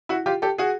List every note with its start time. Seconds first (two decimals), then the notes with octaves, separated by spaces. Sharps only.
0.09 E4 F#4
0.26 F4 G4
0.42 G4 A4
0.58 F#4 G#4